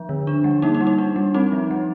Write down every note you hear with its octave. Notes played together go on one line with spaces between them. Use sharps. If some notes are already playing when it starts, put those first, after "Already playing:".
Already playing: F3
D3
D4
G3
A#3 D#4
D#4
G3
D#4
D4
G3
C4 D#4
F3
G3